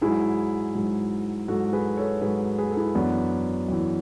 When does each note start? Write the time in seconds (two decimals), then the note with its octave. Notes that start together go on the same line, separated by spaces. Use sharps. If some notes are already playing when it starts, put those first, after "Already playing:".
0.02 G#2 F#3 E4 G#4
0.75 G#2 F#3
1.48 G#2 F#3 F#4 A4
1.73 G#4 B4
1.97 A4 C#5
2.22 G#2 F#3 G#4 B4
2.58 G#4 B4
2.70 A4
2.77 E4 G#4
2.95 F#2 E3 B3 D4
3.68 F#2 E3